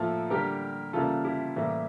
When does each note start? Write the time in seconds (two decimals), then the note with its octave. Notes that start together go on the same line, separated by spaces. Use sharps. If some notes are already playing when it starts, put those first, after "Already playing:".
Already playing: A2 F3 A#3 F4 A4
0.30 D3 G3 A#3 G4 A#4
0.93 C#3 E3 G3 A#3 F4 A4
1.24 E4 G4
1.56 A2 E3 G3 A#3